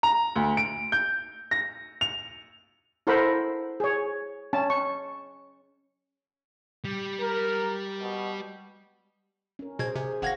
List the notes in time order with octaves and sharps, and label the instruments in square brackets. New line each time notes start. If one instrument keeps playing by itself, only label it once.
[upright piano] A#5
D2
D7
G6
A#6
F7
[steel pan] E4 A4 A#4 C5 F#5 B5
G#4 C#5
C#4 A5
C#6
[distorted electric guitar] G3
[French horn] A#4
B2
[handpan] C#4 A#4
[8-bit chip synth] B2 G#6 [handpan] G#4 C5
[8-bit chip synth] C3 [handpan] G#4
[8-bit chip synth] G#1 G#6 A#6 [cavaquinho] F#4 F5 G5